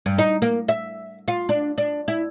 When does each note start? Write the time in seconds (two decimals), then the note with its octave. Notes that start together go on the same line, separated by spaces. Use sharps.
0.06 G2
0.19 D#4
0.42 A#3
0.68 E5
1.28 F4
1.49 D4
1.78 D4
2.08 E4